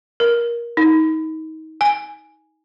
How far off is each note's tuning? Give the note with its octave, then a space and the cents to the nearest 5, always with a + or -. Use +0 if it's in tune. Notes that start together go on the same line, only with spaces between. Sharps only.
A#4 +20
D#4 +30
G#5 +0